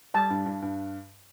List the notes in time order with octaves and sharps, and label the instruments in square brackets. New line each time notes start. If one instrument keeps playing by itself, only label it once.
[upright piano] G3 [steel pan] A5
[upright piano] G2
G2
G2